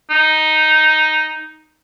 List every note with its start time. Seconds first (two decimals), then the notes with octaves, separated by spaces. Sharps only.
0.10 D#4